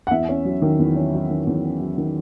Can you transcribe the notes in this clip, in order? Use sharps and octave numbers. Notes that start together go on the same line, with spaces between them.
F#5
E2 E5
C#4
F#3
D#3
E2
C#4
F#3
D#3
E2
C#4
F#3
D#3